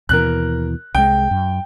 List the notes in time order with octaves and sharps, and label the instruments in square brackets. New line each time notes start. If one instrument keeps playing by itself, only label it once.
[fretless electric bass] D#2 B2 E3 [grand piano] A#4 F#6
[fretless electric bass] C2 G#3 [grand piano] G5
[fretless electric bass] F#2